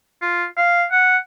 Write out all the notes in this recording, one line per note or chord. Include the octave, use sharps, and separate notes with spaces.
F4
F5
F#5